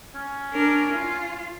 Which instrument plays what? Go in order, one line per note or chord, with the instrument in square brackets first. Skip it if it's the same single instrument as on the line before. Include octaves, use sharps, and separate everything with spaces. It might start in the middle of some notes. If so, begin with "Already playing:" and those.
[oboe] C#4
[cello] D4 A#4
F4